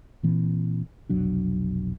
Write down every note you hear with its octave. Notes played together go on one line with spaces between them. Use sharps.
A#2 E3 C4
F1 B1 F#3 D4